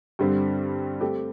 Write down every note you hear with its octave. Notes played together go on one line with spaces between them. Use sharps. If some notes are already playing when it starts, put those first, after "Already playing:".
G2 D3 G3 C4
A3 C4 G4